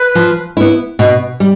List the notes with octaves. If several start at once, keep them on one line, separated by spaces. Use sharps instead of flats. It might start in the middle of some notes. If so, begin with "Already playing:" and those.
Already playing: B4
F3
B3 E4
B2
G3